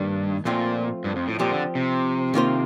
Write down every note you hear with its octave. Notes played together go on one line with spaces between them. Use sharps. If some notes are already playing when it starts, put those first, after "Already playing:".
Already playing: G2 D#3 A#3 D#4
A#2 F3 A3 C4 F4
G2
F2
A2
A#2 F3 C4 G4 D5
D3
C3
D#3 A#3 F4 C5